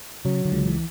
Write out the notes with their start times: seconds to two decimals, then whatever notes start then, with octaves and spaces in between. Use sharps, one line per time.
0.25 C#3 F#3
0.45 D3
0.52 C#2
0.66 E3